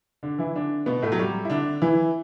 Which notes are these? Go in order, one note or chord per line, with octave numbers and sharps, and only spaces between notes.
D3 D4
E3 E4
D3 D4
B2 B3
A2 A3
F#3
G3
E4
D3 D4
E3 E4